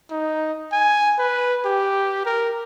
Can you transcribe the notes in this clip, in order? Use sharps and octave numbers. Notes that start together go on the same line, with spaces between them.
D#4
G#5
B4
G4
A#4